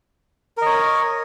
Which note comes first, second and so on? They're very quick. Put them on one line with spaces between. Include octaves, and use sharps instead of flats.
A#4 D#5 C#5